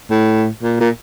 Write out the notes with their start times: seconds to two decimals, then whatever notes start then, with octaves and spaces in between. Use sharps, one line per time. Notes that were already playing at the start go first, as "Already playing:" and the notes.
0.10 A2
0.63 A#2
0.80 A#2